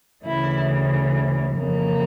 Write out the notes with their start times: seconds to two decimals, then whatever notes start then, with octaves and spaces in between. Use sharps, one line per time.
0.25 D2 C#3 E3 E4
1.56 F2 C#3 E3 A#3